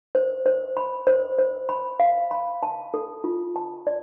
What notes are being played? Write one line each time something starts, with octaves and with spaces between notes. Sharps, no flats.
C5
C5
B5
C5
C5
B5
F5
B5
A5
A4
F4
A5
D5